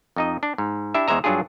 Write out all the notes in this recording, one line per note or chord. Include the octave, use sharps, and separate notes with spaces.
F2 D#4 D#5
D4
G#2
D4 E4 G4 E5
E2 G#3 C5 E5 A#5
G2 F#3 D4 F4 G#4